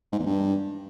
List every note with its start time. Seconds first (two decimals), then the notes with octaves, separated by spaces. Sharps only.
0.12 G#2
0.19 E2
0.26 G2